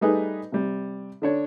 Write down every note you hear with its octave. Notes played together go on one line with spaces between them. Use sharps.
G3 A3 D#4 G#4 B4 D#5
C3 G3
D3 D4 C#5